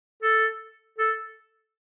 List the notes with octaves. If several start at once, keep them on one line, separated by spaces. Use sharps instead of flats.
A4
A4